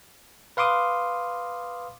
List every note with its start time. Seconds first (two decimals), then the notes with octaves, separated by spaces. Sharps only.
0.57 B4 F5 C6 D6 D#6